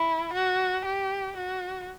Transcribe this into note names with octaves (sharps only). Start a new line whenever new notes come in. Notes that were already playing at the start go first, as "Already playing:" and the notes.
Already playing: E4
F#4
G4
F#4